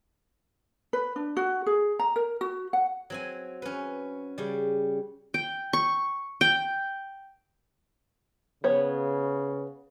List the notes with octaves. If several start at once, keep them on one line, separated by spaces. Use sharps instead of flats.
B4
D4
F#4
G#4
A#5
A#4
F#4
F#5
F#3 C4 G#5
C#4 B4
C#3 G3
G5
C#6
G5
C#3 B3 C#5